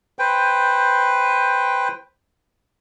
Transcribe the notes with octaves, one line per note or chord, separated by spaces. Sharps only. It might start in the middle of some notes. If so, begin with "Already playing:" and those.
B4 C5 G5